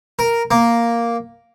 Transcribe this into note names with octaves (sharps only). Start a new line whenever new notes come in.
A#4
A#3